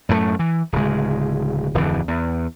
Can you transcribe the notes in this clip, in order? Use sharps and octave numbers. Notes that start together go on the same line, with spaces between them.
F#2 A2 C3 A3
E3
D1 C#3 G#3
D1 F2 D3 E3
E2